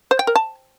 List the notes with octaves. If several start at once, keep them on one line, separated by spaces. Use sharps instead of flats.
C5
G5
A#4
A5